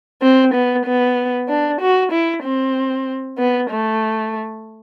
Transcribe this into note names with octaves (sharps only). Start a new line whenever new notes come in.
C4
B3
B3
D4
F#4
E4
C4
B3
A3